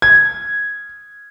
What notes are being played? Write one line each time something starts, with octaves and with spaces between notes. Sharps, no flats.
G#6